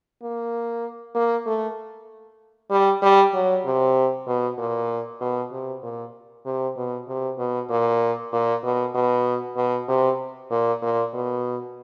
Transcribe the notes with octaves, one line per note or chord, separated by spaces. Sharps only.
A#3
A#3
A3
G3
G3
F#3
C3
B2
A#2
B2
C3
A#2
C3
B2
C3
B2
A#2
A#2
B2
B2
B2
C3
A#2
A#2
B2